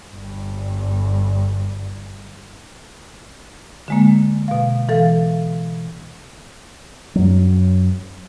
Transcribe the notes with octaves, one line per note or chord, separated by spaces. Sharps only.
G1 G2
D3 G#3 A#3
B2 F5
E3 A4 F5
F#2 F#3